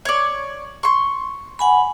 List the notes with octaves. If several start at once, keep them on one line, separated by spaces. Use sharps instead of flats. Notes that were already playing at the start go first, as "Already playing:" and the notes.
C#5 D5
C6 C#6
F#5 G#5 B5